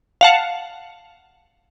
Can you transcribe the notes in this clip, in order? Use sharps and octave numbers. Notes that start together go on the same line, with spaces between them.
F5 F#5 A5